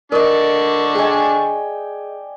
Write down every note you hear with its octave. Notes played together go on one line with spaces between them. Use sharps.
D3 D4 A#4 D5 D#5 C#6
G#4 D#5 G5 G#5